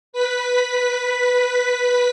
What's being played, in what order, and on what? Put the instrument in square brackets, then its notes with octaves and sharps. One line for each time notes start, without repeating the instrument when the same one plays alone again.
[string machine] B4 B6